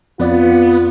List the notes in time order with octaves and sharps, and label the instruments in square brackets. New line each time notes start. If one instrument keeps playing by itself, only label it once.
[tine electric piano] F2 D5 [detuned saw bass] B3 [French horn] F4